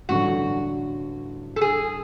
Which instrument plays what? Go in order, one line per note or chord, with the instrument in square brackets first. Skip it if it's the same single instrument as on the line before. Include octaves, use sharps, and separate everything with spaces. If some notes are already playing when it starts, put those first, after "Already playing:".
[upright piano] A1 G2 D3 F#3 A3 [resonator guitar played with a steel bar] F#4
[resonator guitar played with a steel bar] A4
G#4